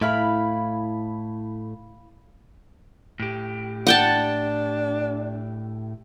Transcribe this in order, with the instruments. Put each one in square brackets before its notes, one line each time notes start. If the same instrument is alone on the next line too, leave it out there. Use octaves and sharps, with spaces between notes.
[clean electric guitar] A2 [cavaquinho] E4 F5 B5
[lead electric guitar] A2 G4
[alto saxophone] D4 [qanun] F#5 G5 A5